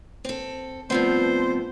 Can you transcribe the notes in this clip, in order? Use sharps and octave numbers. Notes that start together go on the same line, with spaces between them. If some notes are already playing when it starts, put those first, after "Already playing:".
C4 A4
G2 F3 A3 B3 C4 C5